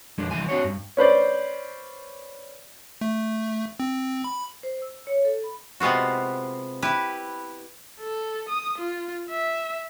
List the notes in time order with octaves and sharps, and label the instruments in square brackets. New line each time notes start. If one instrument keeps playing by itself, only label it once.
[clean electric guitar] F2 G#3 D4
C2 B2 E3 F3 G#5
C4 D4 F#4 C#5
G2
[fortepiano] C#4 B4 C5 D5
[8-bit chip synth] A3
C4
B5
[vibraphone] C5
E6
C#5
A4
B5
[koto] C3 G#3 B3 F4 F#4
E4 G4 B4
[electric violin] A4
D#6
F4
E5